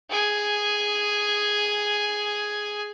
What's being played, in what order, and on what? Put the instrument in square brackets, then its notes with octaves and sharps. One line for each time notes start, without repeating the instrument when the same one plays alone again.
[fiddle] G#4 G#5